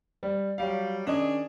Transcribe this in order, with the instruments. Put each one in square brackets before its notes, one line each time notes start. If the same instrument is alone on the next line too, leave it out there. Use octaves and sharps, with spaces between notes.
[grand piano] G3
[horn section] F#3 G3 [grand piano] F5
[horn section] D#3 D4 G#4 [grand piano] C#4 D#5